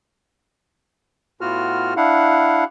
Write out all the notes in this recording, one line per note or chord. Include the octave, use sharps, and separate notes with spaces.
A2 B3 F4 F#4 F6
D4 E4 F5 F#5